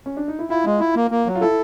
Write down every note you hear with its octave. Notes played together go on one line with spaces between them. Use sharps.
C#4
D4
D#4
E4
E4 F4
G#3
E4
A#3
A#3
F#3
F4
E4 A4